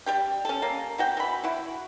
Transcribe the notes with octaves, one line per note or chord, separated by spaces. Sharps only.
G3 G4 G5
C#4 A4
A#3
B3 F#4 G5
E3 B5
E4 F#4